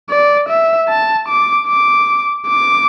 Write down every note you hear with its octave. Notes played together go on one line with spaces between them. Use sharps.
D5
E5
A5
D6
D6
D6